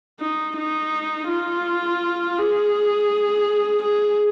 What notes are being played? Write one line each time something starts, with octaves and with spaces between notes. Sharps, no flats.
D#4
D#4
F4
G#4
G#4